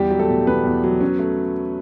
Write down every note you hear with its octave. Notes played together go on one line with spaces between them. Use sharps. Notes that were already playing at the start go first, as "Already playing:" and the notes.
Already playing: E2 G3 G4
F#3
A3 A4
B2
E2 B3 B4
E2
F#3
C#4
A3